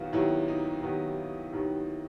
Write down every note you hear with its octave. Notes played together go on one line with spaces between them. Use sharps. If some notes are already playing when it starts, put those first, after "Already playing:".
Already playing: D#2 D#3 F#3 B3 F4 F#4
D#2 D#3 F#3 B3 E4
D#4
D#2 D#3 F#3 B3
D#2 D#3 F#3 B3